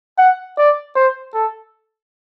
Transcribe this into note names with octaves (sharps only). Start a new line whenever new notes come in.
F#5
D5
C5
A4